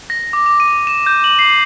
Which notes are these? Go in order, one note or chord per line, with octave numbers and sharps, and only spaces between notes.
A#6
D6
D6
D#7
E7
G6
F#7
C7